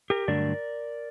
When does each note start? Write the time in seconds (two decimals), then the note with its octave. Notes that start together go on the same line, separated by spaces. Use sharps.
0.10 G4 A#4
0.28 G2 D3 F#3 A3 D4 A#4 D5